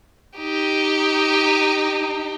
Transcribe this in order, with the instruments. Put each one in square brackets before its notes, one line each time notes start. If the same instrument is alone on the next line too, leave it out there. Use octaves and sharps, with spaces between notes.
[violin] D#4 G4